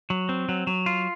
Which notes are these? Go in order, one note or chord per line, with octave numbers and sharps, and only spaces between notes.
F#3
C4
F#3
F#3
F4